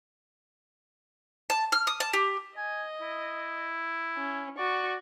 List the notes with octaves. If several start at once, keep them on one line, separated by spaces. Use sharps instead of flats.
A5
F6
D#6
A5
G4
D#5 G#5
E4
C#4
F#4 D5 C#6